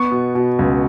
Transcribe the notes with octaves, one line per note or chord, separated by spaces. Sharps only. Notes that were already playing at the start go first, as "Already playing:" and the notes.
Already playing: B3 C#6
B2
B2
C#2